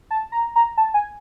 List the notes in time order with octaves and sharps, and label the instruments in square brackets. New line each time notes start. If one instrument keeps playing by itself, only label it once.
[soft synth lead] A5
A#5
A#5
A5
G#5